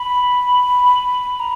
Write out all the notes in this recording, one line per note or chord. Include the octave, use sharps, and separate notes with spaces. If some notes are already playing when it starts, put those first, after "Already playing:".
Already playing: B5
A#5